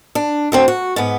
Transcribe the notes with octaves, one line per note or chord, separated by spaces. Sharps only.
D4
D2 D3 C4
F#4
G#2 B3